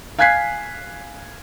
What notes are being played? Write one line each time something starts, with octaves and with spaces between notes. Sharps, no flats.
F5 G#5 F#6 G#6 B6 C7